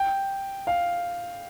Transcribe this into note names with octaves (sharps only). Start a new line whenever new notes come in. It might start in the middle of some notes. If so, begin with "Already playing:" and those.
Already playing: G5
F5